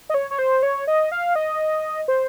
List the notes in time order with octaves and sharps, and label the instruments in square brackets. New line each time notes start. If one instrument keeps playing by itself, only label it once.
[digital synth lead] D#5
C#5
C#5
C5
C#5
D#5
F5
D#5
C5